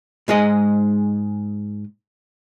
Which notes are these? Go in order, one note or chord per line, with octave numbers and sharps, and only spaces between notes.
G#2 G#3 G#4 D#5